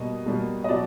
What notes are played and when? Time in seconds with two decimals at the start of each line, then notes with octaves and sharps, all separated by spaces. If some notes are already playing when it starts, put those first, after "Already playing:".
Already playing: B2 G3 A#3 D#5
0.26 B2 G3 A#3
0.64 D#5
0.69 B2 F#3 D5